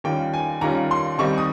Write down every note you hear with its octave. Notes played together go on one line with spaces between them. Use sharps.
D#2 D#3 G3 C#4 F4 G5
G#5
D#2 D#3 G3 C#4 F4 A#5
C6
D#2 D#3 G3 C4 D#4 C#6
D#6